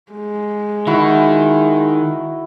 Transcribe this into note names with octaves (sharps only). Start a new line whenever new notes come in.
G#3
D#3 E4 F#4